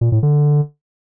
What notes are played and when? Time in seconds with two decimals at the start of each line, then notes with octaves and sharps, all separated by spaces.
0.01 A#2
0.12 A2
0.23 D3